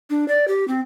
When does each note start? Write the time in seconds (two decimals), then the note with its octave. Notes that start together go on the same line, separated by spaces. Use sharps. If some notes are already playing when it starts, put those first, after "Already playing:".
0.10 D4
0.28 D5
0.48 G4
0.68 C4